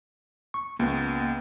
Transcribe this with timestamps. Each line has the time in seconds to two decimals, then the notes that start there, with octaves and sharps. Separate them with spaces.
0.54 C#6
0.79 C#2 A#3 B3